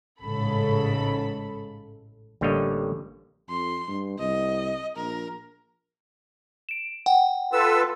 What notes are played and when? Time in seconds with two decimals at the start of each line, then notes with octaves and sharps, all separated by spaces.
0.21 A1 G#2 C#3 A4 B5
2.41 A1 D3 G3 A#3 C#5 D#5
3.49 F2 C6
3.88 G2
4.18 C2 D#5
4.96 A#1 A#4
6.69 D7 E7
7.06 F#5 G5
7.53 F4 A4 B4 E6